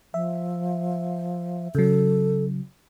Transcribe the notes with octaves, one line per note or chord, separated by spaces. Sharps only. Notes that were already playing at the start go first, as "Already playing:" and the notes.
F3 E5
C#3 F#3 A4